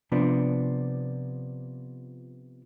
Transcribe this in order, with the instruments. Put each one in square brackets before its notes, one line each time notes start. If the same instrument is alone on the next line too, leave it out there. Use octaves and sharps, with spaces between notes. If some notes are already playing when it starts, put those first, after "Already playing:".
[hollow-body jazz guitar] C3 F3 B3 D4